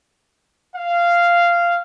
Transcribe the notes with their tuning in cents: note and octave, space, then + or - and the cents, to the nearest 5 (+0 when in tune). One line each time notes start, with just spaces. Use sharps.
F5 -10